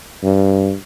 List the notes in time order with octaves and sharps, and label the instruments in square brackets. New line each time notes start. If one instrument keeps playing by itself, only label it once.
[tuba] G2